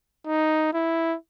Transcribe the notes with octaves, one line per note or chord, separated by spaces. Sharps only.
D#4
E4